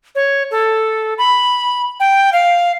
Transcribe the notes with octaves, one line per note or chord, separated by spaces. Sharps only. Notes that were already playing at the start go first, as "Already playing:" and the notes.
C#5
A4
B5
G5
F5